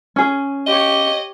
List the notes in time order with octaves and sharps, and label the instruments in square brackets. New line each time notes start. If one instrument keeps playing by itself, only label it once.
[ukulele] C#4 G#4
[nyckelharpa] G4 C#5 [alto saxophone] D#5